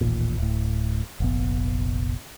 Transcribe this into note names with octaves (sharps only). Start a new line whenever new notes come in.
D#1 A1 D#2 A#2
D1 A2
F1 A#1 B3